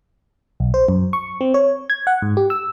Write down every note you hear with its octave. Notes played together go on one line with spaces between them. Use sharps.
B1
C5
F#2
C#6
C4
C#5
G#6
F#5
G#2
G4
E6